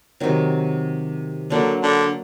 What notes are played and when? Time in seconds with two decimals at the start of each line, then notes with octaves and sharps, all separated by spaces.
0.20 C3 D#3 F#3
1.50 D3 F#3 A#3 D4
1.83 D3